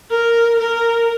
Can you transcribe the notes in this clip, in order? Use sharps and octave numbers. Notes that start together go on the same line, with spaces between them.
A#4
A#4